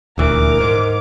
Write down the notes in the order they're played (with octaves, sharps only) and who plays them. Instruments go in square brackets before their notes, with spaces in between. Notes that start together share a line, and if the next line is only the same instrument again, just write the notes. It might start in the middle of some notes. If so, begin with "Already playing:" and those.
[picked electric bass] D#1 D2 E3 [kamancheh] A#4 D6
[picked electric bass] G#2